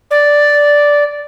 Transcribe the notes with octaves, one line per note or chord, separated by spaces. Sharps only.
D5